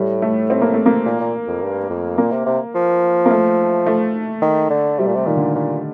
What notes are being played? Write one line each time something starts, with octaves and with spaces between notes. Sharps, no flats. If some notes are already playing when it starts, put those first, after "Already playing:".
Already playing: A2 G3
A3
C4
A#3
A3
A#3
A#2
A#2
F2
G2
F2
A#2 A#3
C3
C3
F3
A#3
A3
A3
D#3
D3
C3 G3
A#2
C3
A#2 D#3
D3
A#2